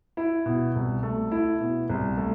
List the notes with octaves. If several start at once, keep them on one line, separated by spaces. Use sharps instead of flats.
E4
B2
C2
A3
E4
B2
C2
A3